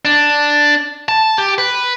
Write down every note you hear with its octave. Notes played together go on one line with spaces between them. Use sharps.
D4
A5
G4
B4